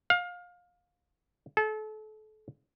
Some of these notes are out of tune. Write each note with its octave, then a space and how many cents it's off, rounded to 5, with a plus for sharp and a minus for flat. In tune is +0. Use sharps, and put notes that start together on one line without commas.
F5 +25
A4 -35